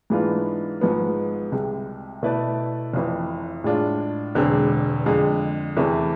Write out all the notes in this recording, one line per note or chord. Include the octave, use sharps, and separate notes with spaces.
G#2 E3 B3 D4 F4
G#1 G#2 F3 G#3 B3
C2 C3 G#3
B2 A3 E4 B4 D5
F1 F2 E3
A2 G#3 D4 F4
E1 E2 D3 G#3 C4
F2 D3 G#3
E2 C3 E3 A3